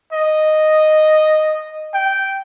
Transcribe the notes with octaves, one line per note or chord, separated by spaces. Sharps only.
D#5
G5